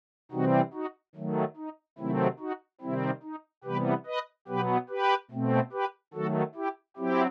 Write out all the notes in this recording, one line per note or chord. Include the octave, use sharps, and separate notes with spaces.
C3 E3 G3 C4 D#4 F#4
D#4 F#4
D#3 F#3 A3
D#4
C3 D#3 F#3 A3 C4 E4
D#4 F#4
C3 D#3 G3 C4 E4
D#4
C3 E3 G3 B3 G4 B4
B4 D#5
B2 F#3 B3 G4 B4
G4 B4
B2 A3 C4
G4 B4
D#3 F#3 A3 F#4 A4
E4 G4
F#3 C4 E4 G4